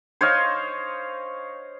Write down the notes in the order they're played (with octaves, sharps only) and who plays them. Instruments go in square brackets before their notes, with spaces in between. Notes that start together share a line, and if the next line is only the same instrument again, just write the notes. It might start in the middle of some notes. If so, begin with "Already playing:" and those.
[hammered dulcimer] C5 C#5 D#5 F5